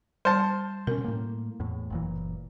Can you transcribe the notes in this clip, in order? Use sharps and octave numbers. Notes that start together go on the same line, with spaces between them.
G3 C5 A5
B2 C#4 A#4
A2 A#3
E2 A2
F#1 A#2 E3